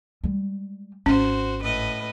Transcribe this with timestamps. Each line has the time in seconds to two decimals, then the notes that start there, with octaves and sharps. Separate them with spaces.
0.24 G3 G#3
1.06 G#1 C#4 F#4 C5
1.62 A2 B4 D#5